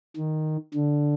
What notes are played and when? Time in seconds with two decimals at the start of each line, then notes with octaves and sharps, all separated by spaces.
0.17 D#3
0.74 D3